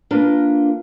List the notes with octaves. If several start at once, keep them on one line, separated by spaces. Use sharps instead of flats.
A#3 D4 F4 A#4 B4